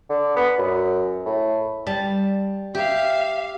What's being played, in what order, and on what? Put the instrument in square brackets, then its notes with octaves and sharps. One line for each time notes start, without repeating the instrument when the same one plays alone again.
[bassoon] D3
B3
F#2
A2
[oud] G3 [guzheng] A5
[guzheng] G4 [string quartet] E5 F5